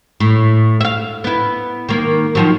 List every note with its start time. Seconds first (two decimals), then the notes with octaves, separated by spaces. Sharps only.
0.20 A2
0.81 E5 F5
1.24 B3 E4
1.89 D#3 A#3
2.35 D#3 F3 F#3